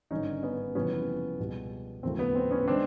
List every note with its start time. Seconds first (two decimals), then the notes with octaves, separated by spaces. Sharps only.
0.11 G#1 G2 D3 C#4 D#4
0.43 B3 C#4
0.75 F#1 F2 C3 E3 G3 B3 C#4
1.40 C#2 B2 G3
2.03 D#2 C#3 F3 A3 C4
2.19 B3
2.35 C4
2.51 B3 C#4
2.68 D#3 G#3 C4 D4